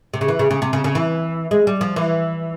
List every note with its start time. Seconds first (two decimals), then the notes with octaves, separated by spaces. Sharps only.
0.13 C3
0.21 C#3
0.28 E3
0.39 C#3
0.51 C#3
0.62 C3
0.73 C#3
0.84 C#3
0.95 E3
1.51 G#3
1.67 G3
1.81 F3
1.96 E3